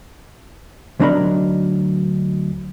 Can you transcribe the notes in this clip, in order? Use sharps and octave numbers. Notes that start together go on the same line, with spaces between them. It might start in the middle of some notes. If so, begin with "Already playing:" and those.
D2 F#3 D4 D#4 A#4 B5